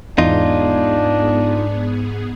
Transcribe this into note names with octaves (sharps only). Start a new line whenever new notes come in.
E2 G#2 B3 D4 D#4 F4 G#4